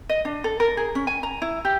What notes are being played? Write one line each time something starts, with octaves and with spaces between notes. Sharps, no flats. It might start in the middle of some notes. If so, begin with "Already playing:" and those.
D#5
D4
A4
A#4
G#4
C#4
G#5
A#5
E4
G4